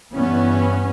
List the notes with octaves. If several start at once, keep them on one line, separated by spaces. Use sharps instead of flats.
G2 E3 B3 C#4